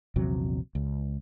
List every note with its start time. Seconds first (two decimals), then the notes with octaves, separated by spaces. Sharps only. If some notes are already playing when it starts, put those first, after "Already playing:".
0.16 A#1 E2 C3 F#3
0.75 C#2